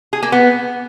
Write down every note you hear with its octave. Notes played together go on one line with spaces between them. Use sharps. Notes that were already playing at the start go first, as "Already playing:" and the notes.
G#4
A#3
B3